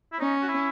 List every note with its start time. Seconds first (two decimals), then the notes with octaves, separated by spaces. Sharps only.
0.13 E4
0.20 C#4 D#4
0.42 F#4
0.49 E4